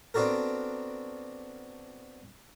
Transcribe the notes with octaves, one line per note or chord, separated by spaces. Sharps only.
B3 C4 D4 F#4 A4 A#4